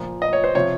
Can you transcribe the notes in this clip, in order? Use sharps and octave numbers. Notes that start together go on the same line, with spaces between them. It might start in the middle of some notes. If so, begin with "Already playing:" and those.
Already playing: A#2 F3
D#5
C#5
C5
C3 F3 C#5